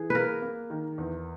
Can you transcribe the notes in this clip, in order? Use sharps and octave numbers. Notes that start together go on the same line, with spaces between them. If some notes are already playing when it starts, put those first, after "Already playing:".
Already playing: E3 G#4
A#3 A#4 B4
A#3
D#3
E2